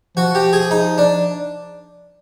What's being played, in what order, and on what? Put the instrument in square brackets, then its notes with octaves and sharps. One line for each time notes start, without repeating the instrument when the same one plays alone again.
[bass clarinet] F3 [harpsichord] F#4
[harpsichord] G4
G#4
D#4
D4